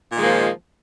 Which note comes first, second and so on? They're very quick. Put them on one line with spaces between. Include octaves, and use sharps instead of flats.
A#2 D#3 G#3 A#3 F3